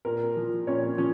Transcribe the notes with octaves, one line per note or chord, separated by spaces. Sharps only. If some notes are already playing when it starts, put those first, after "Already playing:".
A#2 A#4
F3
A#2 C#4 C#5
F3 C#4 C#5